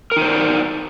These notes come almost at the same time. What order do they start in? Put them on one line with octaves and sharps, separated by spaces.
A#4 D#4 C5 D5